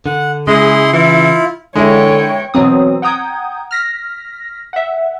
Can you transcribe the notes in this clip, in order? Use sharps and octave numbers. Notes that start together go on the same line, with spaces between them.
D3 F#5
C#3 G#3 E4 G#4 C6
E3 E4 F4
D3 G#3 E4 C#5 G5
B2 E3 F#3 C4 D#6
F#5 G5 A#5 D#6 G6 G#6
F6 A#6 B6
E5 F#5